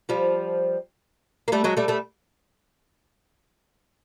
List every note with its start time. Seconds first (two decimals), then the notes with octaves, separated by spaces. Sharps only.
0.09 F3 G3
1.48 A#3
1.52 G3 A3
1.64 F#3 G#3
1.77 G3 A3
1.88 G3 A3